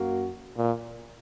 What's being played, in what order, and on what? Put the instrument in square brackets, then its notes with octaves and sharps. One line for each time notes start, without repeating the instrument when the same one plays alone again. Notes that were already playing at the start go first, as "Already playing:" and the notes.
Already playing: [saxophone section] F#2 F#3 A#3 F#4
[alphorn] A#2